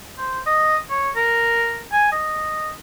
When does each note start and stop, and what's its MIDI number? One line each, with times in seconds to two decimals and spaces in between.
0.18 0.39 72
0.46 0.77 75
0.90 1.10 73
1.16 1.83 70
1.92 2.09 80
2.12 2.71 75